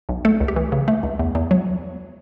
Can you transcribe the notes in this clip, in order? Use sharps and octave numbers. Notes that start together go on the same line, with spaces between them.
B1
A3 A4
C#2
G4
E3
C#3
A3
C#2
E2
E2
F#3